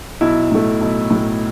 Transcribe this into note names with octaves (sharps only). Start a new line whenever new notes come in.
B1 E4
A2 A3
B1
A2 A3